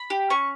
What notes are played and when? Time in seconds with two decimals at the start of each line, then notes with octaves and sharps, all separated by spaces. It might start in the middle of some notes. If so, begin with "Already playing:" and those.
Already playing: B5
0.10 G4
0.30 C#4 C#6